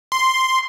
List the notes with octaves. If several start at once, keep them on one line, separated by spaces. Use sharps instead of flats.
C6